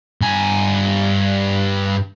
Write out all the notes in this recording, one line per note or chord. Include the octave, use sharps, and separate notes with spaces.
G2 G#5